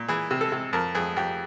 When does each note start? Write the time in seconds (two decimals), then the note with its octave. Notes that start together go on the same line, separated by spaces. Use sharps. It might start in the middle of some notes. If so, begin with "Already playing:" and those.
Already playing: A#2
0.08 E3 G#4
0.31 C3
0.41 A4
0.52 C3
0.73 F2 A#4
0.95 F2 G#4
1.16 F2 G4